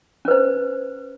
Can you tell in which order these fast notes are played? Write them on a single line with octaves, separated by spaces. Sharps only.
C#4 B4 C5